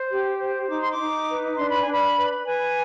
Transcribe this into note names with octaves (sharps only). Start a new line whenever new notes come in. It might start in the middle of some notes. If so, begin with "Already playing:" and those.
Already playing: C5
G4
C5
D#4 D6
C6
D6
D#4
B4
D4 C6
B5
D4 G#5
B5
B4
B4 G#5